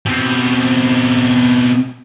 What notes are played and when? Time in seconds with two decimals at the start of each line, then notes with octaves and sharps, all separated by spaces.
0.06 B2 C4